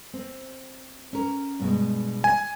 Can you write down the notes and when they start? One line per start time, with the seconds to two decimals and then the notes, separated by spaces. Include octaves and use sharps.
0.14 C4
1.13 C#4 A#4
1.59 G2 B2 G#3
2.24 G#5